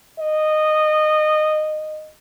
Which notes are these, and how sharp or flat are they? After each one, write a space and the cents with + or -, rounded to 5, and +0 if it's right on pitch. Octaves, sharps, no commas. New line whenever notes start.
D#5 -15